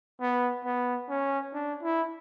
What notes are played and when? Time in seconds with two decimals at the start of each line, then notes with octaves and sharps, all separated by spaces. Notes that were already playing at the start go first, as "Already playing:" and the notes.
0.20 B3
0.65 B3
1.09 C#4
1.53 D4
1.83 E4